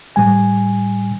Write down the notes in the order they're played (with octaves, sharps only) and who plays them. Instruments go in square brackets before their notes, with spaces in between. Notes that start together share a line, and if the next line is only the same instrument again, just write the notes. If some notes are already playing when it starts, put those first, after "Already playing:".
[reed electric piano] A2 G3 G#5